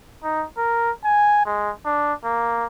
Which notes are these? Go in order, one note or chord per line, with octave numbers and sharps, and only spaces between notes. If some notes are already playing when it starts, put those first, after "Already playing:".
D#4
A#4
G#5
G#3
D4
A#3